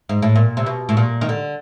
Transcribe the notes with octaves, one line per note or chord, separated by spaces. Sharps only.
G#2
A2
A#2
C3
B2
A2
A#2
D#3
D3